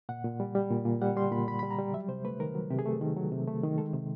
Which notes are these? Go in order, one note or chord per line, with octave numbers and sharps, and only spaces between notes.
A#2 F#5
A#2
G3
G3
A#2
A#2
G3 F#5
G3 C6
A#2 B5
A#2 B5
B5
G3
A#5
G3
F#3 E5
C3 C5
A3 B4
D#3 A#4
F#3
C3 G4
G#4
A3 A4
D#3
F#3
C3
A3
D#3
G#3 A4
C3